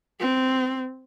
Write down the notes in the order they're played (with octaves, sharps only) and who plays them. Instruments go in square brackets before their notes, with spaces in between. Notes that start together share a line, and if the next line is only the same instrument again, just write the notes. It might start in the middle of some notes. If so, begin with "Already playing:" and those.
[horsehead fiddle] C4